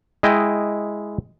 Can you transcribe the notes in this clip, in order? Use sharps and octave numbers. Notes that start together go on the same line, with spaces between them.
G#3 E4 D#5 G5